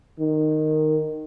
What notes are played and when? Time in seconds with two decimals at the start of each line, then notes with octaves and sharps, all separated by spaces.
0.19 D#3